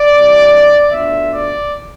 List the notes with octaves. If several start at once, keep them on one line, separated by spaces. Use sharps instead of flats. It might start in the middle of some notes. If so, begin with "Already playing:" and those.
Already playing: D5
C3 E3 G3 D4
B2 A3 D4 F4 E5
D5